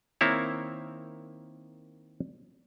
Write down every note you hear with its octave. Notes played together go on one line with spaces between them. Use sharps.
D#3 A#3 C4 E4 C#5